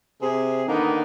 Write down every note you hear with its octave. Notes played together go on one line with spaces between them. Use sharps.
C3 G#4
D3 D#3 A#3 B3 D#4